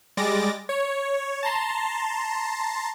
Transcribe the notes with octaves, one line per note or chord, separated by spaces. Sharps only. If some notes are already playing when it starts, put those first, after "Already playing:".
G3 G#3 D6 A6 A#6
C#5
A5 A#5 C6